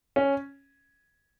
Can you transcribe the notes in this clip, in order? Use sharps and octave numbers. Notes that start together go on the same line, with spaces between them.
C#4